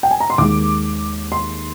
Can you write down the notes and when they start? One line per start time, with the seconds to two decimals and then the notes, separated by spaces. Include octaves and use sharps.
0.03 G5
0.11 G#5
0.20 A#5
0.30 C6
0.38 D#2 D#3 G#3 D6
1.32 C6